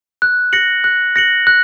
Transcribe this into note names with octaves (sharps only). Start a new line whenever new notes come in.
F#6
A#6 C#7 F#7
F#6
A#6 C#7 F#7
F#6